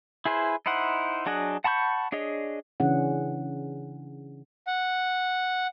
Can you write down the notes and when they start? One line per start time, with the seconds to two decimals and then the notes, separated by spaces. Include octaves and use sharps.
0.25 E4 G#4 B4 C5
0.66 D#4 E4 C5 F#5
1.26 F#3 D4 G#4 D#5 F#5
1.64 F#5 A5 B5 C#6 G6
2.12 D4 G#4 C#5 D#5
2.80 C#3 E3 C#4 D4 G#4 F#5
4.67 F#5